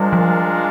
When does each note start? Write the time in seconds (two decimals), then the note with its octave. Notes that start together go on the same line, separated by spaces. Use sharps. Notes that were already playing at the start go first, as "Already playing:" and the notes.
Already playing: G3 G#3 D4 F4 A#4
0.13 F3